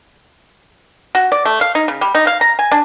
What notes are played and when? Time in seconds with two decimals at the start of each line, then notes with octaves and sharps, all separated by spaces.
1.15 F#4
1.32 D5
1.45 A3
1.61 F5
1.75 D#4
1.88 C#3
2.01 G3
2.15 D#4
2.27 F5
2.41 A#5
2.59 G#5
2.71 D4